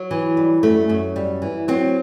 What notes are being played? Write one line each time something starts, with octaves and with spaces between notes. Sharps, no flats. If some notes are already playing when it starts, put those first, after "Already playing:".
Already playing: F#3
E3
G3
F#2 A3
F#2
G3
E3
F#3 C4